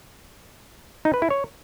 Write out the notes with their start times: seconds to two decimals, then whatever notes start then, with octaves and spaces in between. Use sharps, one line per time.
1.05 D#4
1.14 B4
1.22 E4
1.30 C#5